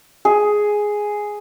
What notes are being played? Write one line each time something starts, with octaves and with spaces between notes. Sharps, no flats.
G#4